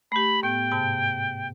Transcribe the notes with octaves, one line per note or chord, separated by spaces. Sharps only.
A3 G4 B5
A2 B3 G5
G#2 C3 A5